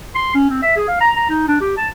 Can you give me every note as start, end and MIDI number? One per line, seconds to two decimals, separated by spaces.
0.15 0.32 84
0.35 0.50 61
0.50 0.58 60
0.62 0.75 76
0.76 0.84 68
0.88 0.98 77
1.00 1.10 82
1.16 1.25 82
1.29 1.44 63
1.48 1.56 62
1.61 1.74 67
1.77 1.88 81